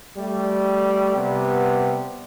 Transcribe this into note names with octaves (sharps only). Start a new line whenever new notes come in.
G3 A3
C3 G3 B3